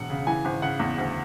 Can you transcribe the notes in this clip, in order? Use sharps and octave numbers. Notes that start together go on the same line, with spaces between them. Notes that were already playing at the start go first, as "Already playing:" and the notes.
Already playing: E1 F#5
C#3
E3 G#5
G#1
C#3 F#5
E2
D2